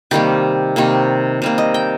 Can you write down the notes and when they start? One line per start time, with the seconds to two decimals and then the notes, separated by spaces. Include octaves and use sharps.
0.11 C3 D#3 G3 A#3 G4
0.76 C3 D#3 G3 A#3
1.42 C3 G3 A#3
1.58 D#5
1.74 G5